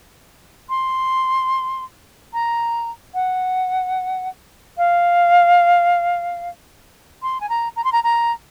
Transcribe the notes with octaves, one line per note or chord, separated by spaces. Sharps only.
C6
A#5
F#5
F5
C6
G#5
A#5
A#5
C6
A#5
A#5